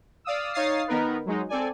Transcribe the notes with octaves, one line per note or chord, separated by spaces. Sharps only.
D5 F5 D#6 E6
D#4 C#5 F5 D#6 A6 C7
D#3 B3 D#4 A#4 B4
F#3 G#3 D#4
C4 A4 D5 G#5